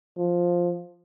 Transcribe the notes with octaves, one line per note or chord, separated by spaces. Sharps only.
F3